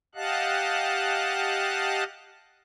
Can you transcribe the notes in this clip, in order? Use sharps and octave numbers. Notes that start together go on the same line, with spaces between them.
G4 D#5 F5 F#5 A5 F#6